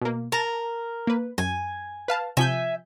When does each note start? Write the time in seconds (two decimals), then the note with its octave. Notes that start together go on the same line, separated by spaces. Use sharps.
0.01 B2 A#3
0.32 A#4 A5 A#5
1.07 A#3 B4
1.38 F#2 G#5
2.08 B4 F5 A5
2.37 C3 F3 E5 G#5 G6